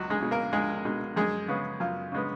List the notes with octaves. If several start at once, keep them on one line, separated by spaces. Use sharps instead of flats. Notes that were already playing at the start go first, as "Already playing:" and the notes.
Already playing: C#2 F#3 F#4
G#3 G#4
B2 G#3
A#3 A#4
C#2 G#3 G#4
B2 G#3
F#2 G#3 G#4
C#3 G#3 B3
F#2 F4
C#3 G#3 B3